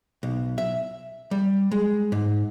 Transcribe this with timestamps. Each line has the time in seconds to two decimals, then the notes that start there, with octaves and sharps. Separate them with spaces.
0.23 B1
0.58 E5
1.31 G3
1.71 G#3
2.12 G#2